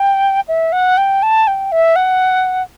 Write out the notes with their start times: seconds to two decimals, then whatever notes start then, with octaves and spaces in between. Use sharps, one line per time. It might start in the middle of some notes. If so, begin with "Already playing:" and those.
Already playing: G5
0.48 E5
0.72 F#5
0.98 G5
1.23 A5
1.47 G5
1.72 E5
1.96 F#5